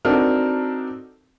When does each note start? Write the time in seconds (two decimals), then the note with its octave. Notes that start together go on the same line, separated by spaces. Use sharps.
0.05 C4 D4 D#4 F#4 A4 A#4